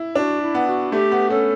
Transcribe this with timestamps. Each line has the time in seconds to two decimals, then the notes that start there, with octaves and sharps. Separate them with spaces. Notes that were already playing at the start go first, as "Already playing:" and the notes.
Already playing: E4
0.15 D4 F#4
0.41 E4
0.55 B3
0.67 F#4
0.92 A3 G4
1.11 B3
1.30 C#4 A4